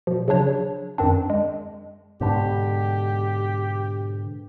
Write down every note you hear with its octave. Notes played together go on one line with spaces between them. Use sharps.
B2 F3
C#3 F#3 D4 C#5
F#2 D#3 C4 D4
G#3
G#2 B2 D3 G4